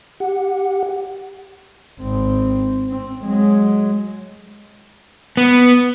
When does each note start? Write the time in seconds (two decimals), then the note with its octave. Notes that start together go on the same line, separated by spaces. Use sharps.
0.20 G4 F#5
1.99 G#1 C4
2.89 C4
3.24 F#3 G#3
5.37 B3